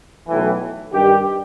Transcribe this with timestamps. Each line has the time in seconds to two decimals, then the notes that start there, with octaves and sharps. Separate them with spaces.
0.28 B1 A2 E3
0.93 G2 D#3 G3 G4